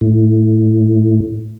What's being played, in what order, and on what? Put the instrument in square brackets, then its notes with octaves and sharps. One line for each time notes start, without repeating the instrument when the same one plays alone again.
[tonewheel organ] A2